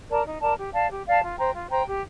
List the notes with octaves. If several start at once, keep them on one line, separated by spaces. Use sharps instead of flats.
A#4 D5 A5
D#4
A#4 D5 A5
G4
D5 F5 A5
G4
D5 F5 A5
F4
C5 G5 A#5
F4
C5 G5 A#5
G4